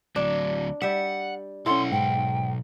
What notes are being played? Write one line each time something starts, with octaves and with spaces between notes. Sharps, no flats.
D2 F#3 D4
G3 E5 F#5
B1 C#4 E4 A4 F#5 C6
G#2 G5